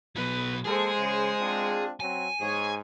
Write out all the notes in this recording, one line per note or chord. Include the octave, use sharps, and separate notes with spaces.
B2 F#3 B4
G#3 A#3 G#4 A4 C5
C#3
C4 D4 F4
F#3 C4 G#5
G#2 G#4 C#5